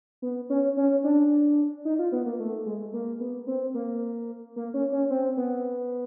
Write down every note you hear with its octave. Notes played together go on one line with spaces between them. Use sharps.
B3
C#4
C#4
D4
D#4
F4
B3
A#3
A3
G#3
A#3
B3
C4
A#3
A#3
C#4
C#4
C4
B3